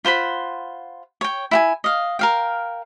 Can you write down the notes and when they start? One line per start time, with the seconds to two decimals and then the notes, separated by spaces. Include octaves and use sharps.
0.05 F4 C5 F#5 B5
1.21 C#5 G5
1.51 E4 G5 G#5
1.84 D#5 F5
2.19 A#4 F5 G5